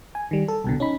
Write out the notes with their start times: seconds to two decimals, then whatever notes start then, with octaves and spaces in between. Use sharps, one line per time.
0.15 G#5
0.31 D#3 G3
0.48 A4
0.64 C2 B2 D3
0.80 C#4 D#4 B5